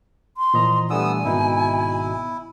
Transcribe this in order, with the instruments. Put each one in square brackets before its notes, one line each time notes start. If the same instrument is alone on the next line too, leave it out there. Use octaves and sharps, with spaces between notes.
[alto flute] C6
[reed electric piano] A#2 E3 [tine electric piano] F3 D#5 A#5
[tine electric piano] G3 A3 D4 [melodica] B3 D#6 E6 [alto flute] G#5
[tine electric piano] G#1 B2 D#4 [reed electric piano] B3 E5 [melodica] E4